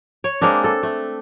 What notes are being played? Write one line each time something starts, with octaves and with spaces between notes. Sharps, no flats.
C#5
G#3 A#3 C4 D4
A4
A3